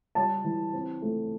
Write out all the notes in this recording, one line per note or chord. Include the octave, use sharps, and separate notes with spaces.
G3 A5
E3
C4
A3